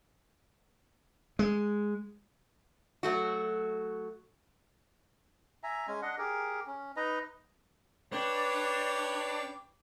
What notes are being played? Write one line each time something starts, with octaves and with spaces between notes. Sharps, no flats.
G#3
F#3 A3 F#4
E5 G#5 A#5
G#3 C#4 G#5
D4 D#5 F#5
G4 G#4 A#4
C#4
D#4 B4 D#5 A#5
D4 G4 B4 C#5 G5 D6